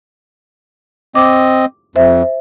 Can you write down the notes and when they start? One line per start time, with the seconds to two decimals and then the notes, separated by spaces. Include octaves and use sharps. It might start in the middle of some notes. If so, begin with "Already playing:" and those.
1.15 C4 D#5 D6
1.96 F2 C5 E5